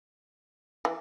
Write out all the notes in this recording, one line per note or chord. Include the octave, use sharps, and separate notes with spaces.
E3